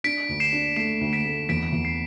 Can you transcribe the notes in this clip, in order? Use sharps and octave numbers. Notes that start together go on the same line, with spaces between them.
D4 B6 D7
D2
C7 E7
D4
A3 C7 E7
D2
B6 D7
A3
E2 B6 D7
E2
C7